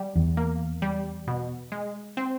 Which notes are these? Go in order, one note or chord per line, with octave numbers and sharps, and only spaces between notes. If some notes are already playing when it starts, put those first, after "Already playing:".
Already playing: G3
E2
A#3
G3
B2
G#3
C4